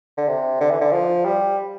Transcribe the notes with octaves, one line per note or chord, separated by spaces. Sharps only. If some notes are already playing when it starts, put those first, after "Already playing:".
D3
C3
D3
E3
D3
F3
G3